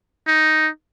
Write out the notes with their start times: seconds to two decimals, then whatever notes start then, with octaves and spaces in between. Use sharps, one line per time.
0.27 D#4